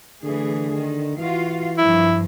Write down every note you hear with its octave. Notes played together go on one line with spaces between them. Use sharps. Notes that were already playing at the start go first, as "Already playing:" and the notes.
D3 E3 A3 G#4
D#3
E3 F4 F#4 F5
G2 F3 E4